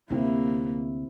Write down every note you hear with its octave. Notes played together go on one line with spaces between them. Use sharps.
D2 C3 A#3 C4 E4